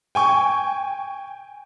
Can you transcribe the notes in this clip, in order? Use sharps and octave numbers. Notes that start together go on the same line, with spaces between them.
G5 G#5 C#6